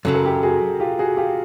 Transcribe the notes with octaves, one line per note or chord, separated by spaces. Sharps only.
F#2 C#3 F#3 A4
A#4
G4 A4
F#4 G#4
F4 G4
F#4 G#4
F4 G4